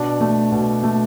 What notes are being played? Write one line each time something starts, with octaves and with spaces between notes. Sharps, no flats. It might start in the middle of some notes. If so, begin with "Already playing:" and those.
Already playing: B2 D4
A3
B2
A3